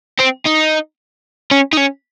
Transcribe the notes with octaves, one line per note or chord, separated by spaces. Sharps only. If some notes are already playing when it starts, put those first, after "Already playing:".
C4
D#4
C#4
D#4
C#4